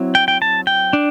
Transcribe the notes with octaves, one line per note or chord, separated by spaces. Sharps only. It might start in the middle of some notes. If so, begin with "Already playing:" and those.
Already playing: F#3 C4 E4
G5
G5
A5
G5
D4